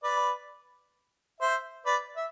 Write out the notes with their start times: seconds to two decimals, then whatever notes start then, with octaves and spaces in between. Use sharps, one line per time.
0.03 B4 D5
1.41 C5 E5
1.86 B4 D5
2.16 E5